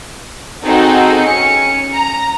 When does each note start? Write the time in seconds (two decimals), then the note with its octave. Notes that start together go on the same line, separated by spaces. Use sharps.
0.63 C4 D#4 F#4 G#4 A4
1.21 C#4 C#7
1.93 A#5